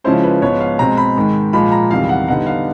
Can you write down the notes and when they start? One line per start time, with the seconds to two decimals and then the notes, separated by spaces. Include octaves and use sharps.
0.04 C#3 F3 G#3 C#4 E4 C5
0.23 B4
0.42 G#2 F3 G#3 B3 C#5
0.60 F5
0.79 B2 G#3 C4 A#5
0.97 B5
1.16 G#2 D#3 G#3
1.53 A#2 F3 G#3 B5
1.72 A#5
1.91 E2 C3 D#3 G3 F5
2.09 F#5
2.28 D3 G3 B3 D#4 F#5
2.46 F5